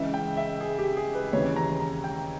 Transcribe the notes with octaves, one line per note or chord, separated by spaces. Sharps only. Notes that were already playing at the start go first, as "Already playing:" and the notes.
Already playing: C#2 C#3 E3 E5
G5
E5
G#4
G4
G#4
B4
D#2 C#3 E3 C#5
A#5
A#5
G5